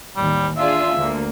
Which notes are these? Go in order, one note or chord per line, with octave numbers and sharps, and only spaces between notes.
A1 D#2 G3
D4 F4 G#4 E5
D2 A#3